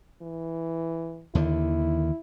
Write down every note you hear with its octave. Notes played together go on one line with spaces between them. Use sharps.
E3
D#2 D3 D#3 E4